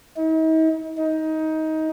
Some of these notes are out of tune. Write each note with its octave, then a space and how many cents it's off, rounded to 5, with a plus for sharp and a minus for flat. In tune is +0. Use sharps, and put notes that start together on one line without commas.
D#4 +45
D#4 +20